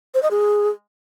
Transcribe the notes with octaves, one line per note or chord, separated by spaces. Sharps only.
C5
D#5
G#4